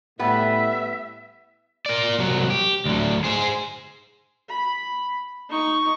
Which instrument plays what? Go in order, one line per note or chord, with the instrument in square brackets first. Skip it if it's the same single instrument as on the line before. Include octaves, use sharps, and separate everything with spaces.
[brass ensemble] A2 [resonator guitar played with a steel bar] G3 B3 B4 [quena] E5
[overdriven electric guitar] A#4 D5
C2 F#3
G4
D2 F#3
G#4 C5
[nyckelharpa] B5
D#4 C#6